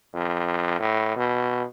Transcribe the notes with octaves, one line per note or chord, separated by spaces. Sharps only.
F2
A2
B2